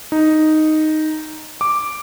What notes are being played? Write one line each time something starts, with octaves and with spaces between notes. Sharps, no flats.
D#4
D6